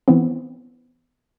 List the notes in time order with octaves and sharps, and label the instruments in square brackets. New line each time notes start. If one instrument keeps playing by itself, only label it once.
[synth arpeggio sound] E3 B3 C4